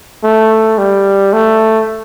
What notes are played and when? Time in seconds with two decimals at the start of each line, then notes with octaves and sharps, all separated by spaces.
0.24 A3
0.78 G3
1.33 A3